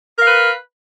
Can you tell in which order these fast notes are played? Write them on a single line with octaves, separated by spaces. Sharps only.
A#4 F5 B4